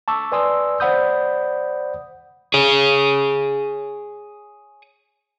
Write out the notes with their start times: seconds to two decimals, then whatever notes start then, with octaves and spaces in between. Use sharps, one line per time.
0.08 A5 C#6 D6 E6
0.32 B4 D5 G#5 C6 D#6 E6
0.80 C5 D5 F#5 B5 D#6 G6
2.54 G#4 C#5